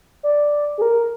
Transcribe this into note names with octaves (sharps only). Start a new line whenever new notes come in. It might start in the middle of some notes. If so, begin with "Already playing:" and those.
D5
G#4
A#4